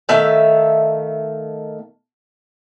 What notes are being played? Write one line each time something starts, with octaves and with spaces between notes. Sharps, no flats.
D#3 A3 E5 F5